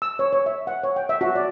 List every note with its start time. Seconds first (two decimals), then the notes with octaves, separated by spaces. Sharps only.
0.02 E6
0.19 C#5
0.33 C#5
0.46 E5
0.67 F#5
0.83 C#5
0.96 G5
1.09 E5
1.21 F#4
1.35 D5